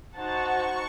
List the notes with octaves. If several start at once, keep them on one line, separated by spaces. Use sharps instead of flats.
D#4 F#4 C5 F#5 A5 C#6